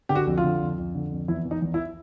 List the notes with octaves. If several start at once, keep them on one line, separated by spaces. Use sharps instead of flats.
D3 G4
F#4
F2
F4
D3
F2
F2
D3
F2
E2 E4
E3
D#4
E2
E4